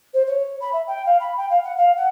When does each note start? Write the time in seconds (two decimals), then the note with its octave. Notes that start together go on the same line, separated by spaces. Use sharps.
0.14 C5
0.27 C#5
0.61 B5
0.73 E5
0.87 G5
1.06 F5
1.20 B5
1.37 G5
1.50 F5
1.64 F#5
1.77 F5
1.97 F#5